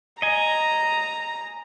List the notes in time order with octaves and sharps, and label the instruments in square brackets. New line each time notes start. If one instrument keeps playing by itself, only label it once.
[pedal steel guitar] D#5 G#5 [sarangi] A#5